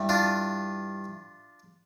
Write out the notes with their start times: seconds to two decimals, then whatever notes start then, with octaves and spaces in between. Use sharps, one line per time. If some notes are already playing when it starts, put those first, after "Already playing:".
Already playing: G2 E3 G3
0.09 D4 F4